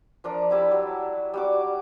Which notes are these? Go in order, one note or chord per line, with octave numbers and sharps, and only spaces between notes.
F3 D4 A#4 A#5
G3 E4 A5 B5
F#3
G3 F#4 D6